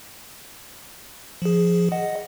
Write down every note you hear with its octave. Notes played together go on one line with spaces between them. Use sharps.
F3 G#4
D#5 F#5